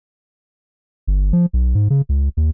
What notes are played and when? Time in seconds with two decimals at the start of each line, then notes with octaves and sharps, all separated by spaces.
1.07 G1
1.33 F3
1.53 B1
1.75 G#2
1.90 C#3
2.09 C#2
2.37 D#2